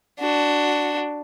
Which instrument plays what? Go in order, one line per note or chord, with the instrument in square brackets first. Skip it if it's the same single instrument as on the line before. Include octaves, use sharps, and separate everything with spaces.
[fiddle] D4 F#4